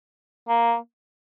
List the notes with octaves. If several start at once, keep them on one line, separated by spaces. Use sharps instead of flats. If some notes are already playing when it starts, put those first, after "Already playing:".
A#3